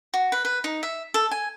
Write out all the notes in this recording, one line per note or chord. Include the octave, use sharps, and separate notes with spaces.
F#4
B4
B4
D#4
E5
A4
G#5